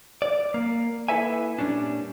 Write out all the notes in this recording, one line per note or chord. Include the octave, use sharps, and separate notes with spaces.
D5
A#3
A#3 E4 A4 B4 E5 G#5
A#2 F#3 G3 C#4 D4